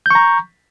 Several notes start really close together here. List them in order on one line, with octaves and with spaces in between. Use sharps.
G6 C#6 A#5